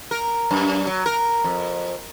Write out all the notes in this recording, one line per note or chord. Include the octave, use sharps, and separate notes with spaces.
A#4
F#2
F#3
A#4
F2